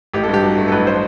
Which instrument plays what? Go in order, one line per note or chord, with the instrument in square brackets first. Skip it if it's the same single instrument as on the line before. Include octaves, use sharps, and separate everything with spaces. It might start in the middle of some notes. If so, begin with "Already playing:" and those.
[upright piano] A1 [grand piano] G4
[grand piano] A4
[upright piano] G2
[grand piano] G4
[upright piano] F#3
A3
[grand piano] A4
[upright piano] A1 [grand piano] B4
[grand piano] C5